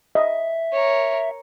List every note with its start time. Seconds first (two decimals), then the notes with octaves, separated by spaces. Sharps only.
0.15 D#5 E5
0.73 A#4 C#5